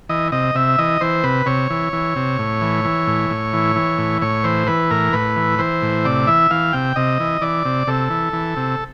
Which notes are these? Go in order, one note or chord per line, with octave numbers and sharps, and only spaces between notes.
E3 D#5
C3 D#5
C3 E5
E3 D#5
E3 C5
C3 B4
C3 C#5
E3
E3
C3
A2
E3
E3
A2
A2
E3
E3
A2
A2 C#5
E3 C5
E3 B4
A2 A#4
A2 B4
E3
E3 C5
A2
C3 D5
E3 E5
E3 F5
C3 G5
C3 D#5
E3
E3 D5
C3
C3 A4
E3
E3
C3